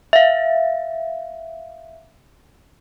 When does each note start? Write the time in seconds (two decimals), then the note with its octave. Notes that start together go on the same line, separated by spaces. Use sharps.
0.13 E5 F5